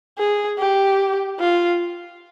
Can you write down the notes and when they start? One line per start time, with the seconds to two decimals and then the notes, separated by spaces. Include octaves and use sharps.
0.19 G#4
0.59 G4
1.40 F4